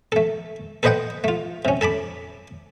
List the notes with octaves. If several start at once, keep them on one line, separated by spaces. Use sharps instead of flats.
A3 A4
A4 B4 C5 D#5 F#5 G5
A3 F4
C3 C#4
A4 A5 B5 D6